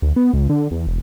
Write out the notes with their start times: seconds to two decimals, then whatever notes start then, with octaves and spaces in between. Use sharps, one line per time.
0.02 D2
0.16 B3
0.33 C#2
0.49 D3
0.71 E2
0.87 E1